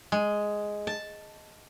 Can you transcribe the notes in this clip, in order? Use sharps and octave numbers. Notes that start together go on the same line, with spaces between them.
G#3
A5